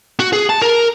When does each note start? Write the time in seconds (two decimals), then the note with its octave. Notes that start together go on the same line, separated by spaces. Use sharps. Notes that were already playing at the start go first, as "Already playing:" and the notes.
0.20 F#4
0.33 G#4
0.50 A5
0.62 A#4